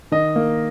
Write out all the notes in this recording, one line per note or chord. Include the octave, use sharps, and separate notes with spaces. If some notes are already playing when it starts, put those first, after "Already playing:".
D#3 D#5
A#3